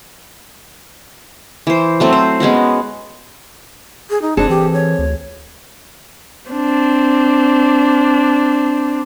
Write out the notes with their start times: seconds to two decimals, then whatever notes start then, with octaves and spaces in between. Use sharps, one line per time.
1.67 E3 C5
2.00 F#3 A3 C4
2.13 C5
2.40 G#3 B3 C#4 F#4
4.10 G#4
4.22 D#4
4.37 F1 C4 D4 G#4 A4
4.50 E3 G4
4.74 C#5
4.99 D2
6.51 C4 D4